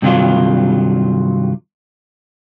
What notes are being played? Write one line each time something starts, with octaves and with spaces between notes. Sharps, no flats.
G2 C3 D#3 F#3 F4